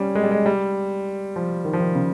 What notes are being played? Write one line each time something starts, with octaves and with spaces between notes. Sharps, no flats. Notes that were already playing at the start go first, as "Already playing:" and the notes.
Already playing: G3 C#4
G#3
G3
G#3
G3
F3
D#3
F3
D#3
C#3